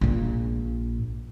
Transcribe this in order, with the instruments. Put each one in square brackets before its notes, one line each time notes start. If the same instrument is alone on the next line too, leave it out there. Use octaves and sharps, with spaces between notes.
[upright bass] A#1 A#2